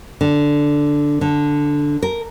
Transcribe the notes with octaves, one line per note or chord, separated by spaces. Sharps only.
D3
D3
A#4